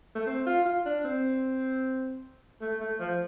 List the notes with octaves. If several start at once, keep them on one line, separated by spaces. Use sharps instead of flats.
A3
C4
F4
F4
D4
C4
A3
A3
F3